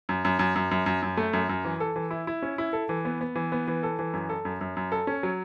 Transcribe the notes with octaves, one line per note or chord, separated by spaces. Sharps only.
F#2
F#2
F#2
F#2
F#2
F#2
F#2
A3
F#2
F#2
E3
A4
E3
E4
E4
C#4
E4
A4
E3
B3
B3
E3
B3
E3
A4
E3
F#2
A4
F#2
F#2
F#2
A4
C#4
F#3